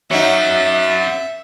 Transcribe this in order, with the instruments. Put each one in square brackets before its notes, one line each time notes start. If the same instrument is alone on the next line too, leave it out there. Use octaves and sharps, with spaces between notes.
[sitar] F#3 D#4 [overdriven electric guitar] C#4 F#5 [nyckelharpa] E5